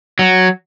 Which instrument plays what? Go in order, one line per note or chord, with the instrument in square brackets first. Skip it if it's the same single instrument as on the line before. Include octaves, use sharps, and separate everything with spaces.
[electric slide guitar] F#3